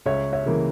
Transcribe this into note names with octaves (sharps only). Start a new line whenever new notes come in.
C#2 C#5 E5
C#5 E5
C#3 E3 A#3